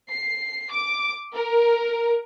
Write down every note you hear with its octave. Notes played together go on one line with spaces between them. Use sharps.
C7
D6
A#4